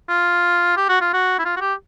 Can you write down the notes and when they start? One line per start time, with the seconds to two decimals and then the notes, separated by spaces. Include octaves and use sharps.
0.09 F4
0.77 G4
0.89 F#4
1.01 F4
1.14 F#4
1.39 E4
1.45 F4
1.56 F#4
1.61 G4